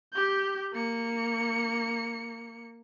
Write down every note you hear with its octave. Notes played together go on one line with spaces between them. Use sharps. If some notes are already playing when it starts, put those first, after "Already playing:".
G4 G6
A#3 C#7